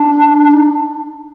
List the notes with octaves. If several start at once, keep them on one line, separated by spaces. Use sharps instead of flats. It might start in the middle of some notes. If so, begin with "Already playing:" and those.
Already playing: D4
D#4